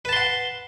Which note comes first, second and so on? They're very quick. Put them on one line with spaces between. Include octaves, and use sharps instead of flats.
B4 A5 C6 F#5